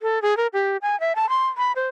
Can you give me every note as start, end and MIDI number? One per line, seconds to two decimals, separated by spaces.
0.02 0.22 69
0.22 0.37 68
0.37 0.47 70
0.53 0.77 67
0.82 0.99 80
1.00 1.15 76
1.16 1.29 81
1.29 1.47 84
1.58 1.72 83
1.76 1.88 72